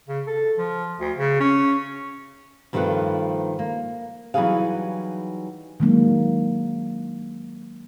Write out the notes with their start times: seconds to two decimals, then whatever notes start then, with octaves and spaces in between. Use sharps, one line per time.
0.08 C#3
0.27 A4
0.57 F3
1.00 D2
1.17 C#3
1.40 C#4
2.73 G2 D#3 F3 F#3 A3 B4
3.59 A#3
4.34 E3 F#3 G3 D#4 G#4 F5
5.80 D#3 F#3 G#3 A#3 D4